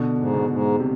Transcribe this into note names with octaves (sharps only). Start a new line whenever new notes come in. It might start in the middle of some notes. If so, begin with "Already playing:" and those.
Already playing: B2 D3
G#2
B2
G#2
C3